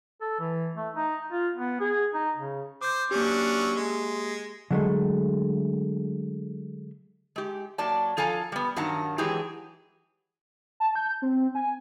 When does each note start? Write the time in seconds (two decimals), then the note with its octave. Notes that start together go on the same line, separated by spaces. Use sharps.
0.21 A4
0.40 E3
0.76 A3
0.96 D#4
1.32 F4
1.56 B3
1.80 G#4
2.14 D#4
2.37 C#3
2.81 C5 D6 G6
3.11 F#3 A#3 C#4 D4 G4
3.76 G#3
4.71 D3 F#3 G#3 A3
7.36 G#3 G4
7.78 F#3 A#3 D5 A5
8.17 F3 A4 F5 G#5 A#5
8.52 G3 B3
8.76 G2 D#3 F#3 F#5 A5 A#5
9.18 E3 F#3 G#3 G4 G#4
10.80 A5
10.96 G6
11.22 C4
11.55 G#5